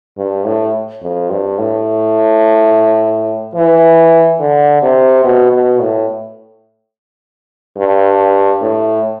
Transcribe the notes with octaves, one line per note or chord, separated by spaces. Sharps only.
G2
A2
F2
G2
A2
E3
D3
C3
B2
B2
A2
G2
A2